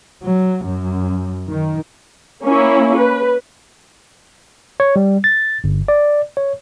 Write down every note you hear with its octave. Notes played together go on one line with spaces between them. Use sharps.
F#3
F#2
D#3
A#3 C#4 E4
B4
C#5
G3
A6
G1
D5
C#5